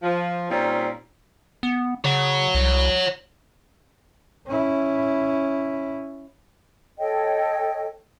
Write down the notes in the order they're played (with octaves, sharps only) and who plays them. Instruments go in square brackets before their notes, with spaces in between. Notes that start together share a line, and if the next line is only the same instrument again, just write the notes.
[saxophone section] F3
A#2 G3 C4 C#4 D#4
[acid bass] B3
[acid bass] C#3 [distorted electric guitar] C#5 F#5
[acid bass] C2
[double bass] C#4 E4
[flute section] A4 C#5 D#5 G5